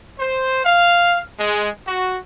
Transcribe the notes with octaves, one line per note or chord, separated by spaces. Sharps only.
C5
F5
G#3
F#4